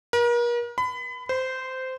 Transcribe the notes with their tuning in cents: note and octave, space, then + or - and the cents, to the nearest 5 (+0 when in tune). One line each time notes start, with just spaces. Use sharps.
A#4 +40
B5 +30
C5 -15